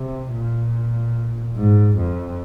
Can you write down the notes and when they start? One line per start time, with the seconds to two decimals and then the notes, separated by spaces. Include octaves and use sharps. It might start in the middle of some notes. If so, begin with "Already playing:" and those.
Already playing: C3
0.33 A#2
1.56 G#2
1.97 F2